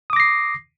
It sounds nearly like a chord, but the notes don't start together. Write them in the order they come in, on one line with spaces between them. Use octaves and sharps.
D#6 D6 A#6 C7